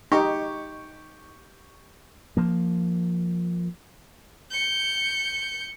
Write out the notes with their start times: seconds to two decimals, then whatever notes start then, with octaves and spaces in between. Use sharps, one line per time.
0.12 D#4 G4 C#6
2.37 F3 A#3
4.50 G6 C#7